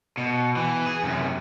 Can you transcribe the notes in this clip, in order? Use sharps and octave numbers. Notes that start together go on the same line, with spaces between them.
B2
E3
G#4
F#2 C3